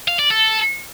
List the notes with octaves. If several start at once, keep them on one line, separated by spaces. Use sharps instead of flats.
F5
D5
A4